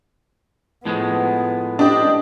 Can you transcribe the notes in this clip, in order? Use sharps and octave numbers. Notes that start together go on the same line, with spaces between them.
A2 F3 G#3 B3
D4 G4 D#5